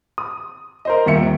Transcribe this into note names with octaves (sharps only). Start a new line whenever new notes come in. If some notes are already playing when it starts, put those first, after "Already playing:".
D#6
A#4 C5 D#5
D#1 D#2 E5 C#7